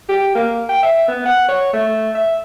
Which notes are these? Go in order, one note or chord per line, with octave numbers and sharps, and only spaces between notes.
G4
A#3
G5
E5
B3
F#5
C#5
A3
E5